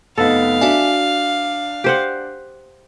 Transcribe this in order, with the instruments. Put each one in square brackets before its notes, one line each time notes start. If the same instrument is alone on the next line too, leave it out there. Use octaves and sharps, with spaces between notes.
[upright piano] F1 B3 D#4 [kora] A4 [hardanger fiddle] F5
[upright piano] D4 [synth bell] F#4 E5 G#5
[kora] G4 C5 F#5